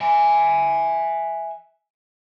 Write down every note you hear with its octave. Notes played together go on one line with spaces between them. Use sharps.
E5 G#5